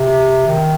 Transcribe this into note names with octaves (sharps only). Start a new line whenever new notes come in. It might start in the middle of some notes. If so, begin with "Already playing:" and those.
Already playing: C3
D#3